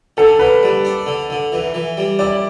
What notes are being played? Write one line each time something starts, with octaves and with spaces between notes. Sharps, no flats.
D3 A4
D3 B4
G3
D4
D3
D3
E3
E3
G3
E4 D5